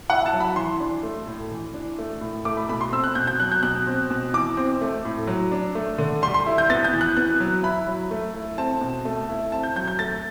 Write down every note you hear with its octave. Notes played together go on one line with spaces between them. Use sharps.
E4 F#5
A5
F#3
B5
E3 C6
D4
A3
A2
E3
D4
A3
A2
A3 D6
B5
B2 B5
C6
C4 E6
F#6
B2 G6
G6
F#3 F#6
G6
B2 F#6
C4
B2
E3 D6
C4
A3
A2
F#3
D4
A3
D3
G3 C6
C6
E4
G6
B3 A6
G6
E3
F#6
B3 F#6
F#3
E4 B5
F#3
A3
E4
C4 A5
B2
A3
E4
C4 A5
G6
F#3 G6
G6
A3 A6